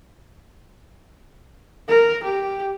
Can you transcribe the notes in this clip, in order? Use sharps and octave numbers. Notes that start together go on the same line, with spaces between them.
A#4
G4